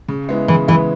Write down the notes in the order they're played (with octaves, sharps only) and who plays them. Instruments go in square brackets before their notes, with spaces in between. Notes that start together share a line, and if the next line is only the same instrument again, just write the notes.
[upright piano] C#3
G#3 B3 E4
[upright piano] C#3 [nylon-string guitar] E3
[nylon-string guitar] E3 [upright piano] G#3 B3 E4